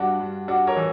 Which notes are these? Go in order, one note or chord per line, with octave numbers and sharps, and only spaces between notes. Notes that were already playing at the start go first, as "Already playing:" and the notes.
Already playing: G2 G3 D4 F#4
G2
G3 D4 F#4
A#4 C#5
E3